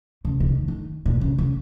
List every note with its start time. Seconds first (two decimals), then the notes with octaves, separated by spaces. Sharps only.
0.25 C#3
0.40 C#3
0.46 D#3
0.68 D#3
1.06 A#2
1.21 C#3
1.38 C#3